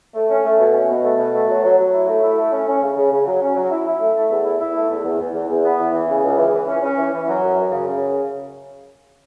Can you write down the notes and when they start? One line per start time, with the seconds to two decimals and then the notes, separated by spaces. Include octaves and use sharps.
0.14 A3
0.29 C#4
0.44 A3
0.59 B2
0.73 C#4
0.89 B2
1.03 A3
1.18 B2
1.33 A3
1.48 F#3
1.63 F#3
1.77 F#3
1.93 E4
2.07 A3
2.22 E4
2.37 A3
2.51 C#4
2.66 C#4
2.81 C#3
2.96 C#3
3.11 C#3
3.26 F#3
3.40 C#4
3.55 F#3
3.70 E4
3.85 E4
4.00 A3
4.14 A3
4.30 E2
4.44 E4
4.59 E4
4.74 A3
4.89 E2
5.04 E2
5.19 E2
5.33 E2
5.48 E2
5.63 B3
5.78 E2
5.93 E3
6.08 C#3
6.22 C#2
6.37 E3
6.52 E3
6.67 C#4
6.82 C#4
6.97 E3
7.11 E3
7.27 F#3
7.41 F#2
7.56 F#2
7.71 C#3
7.86 C#3